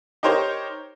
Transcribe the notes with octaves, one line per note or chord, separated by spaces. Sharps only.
D#4 G4 A#4 C5 C#5